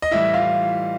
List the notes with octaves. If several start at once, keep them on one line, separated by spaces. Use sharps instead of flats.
D#5
A2 E3 G3 E4 E5
F4 F5